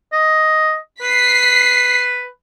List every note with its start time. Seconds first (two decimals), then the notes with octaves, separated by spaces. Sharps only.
0.12 D#5
1.02 B4 B6 C7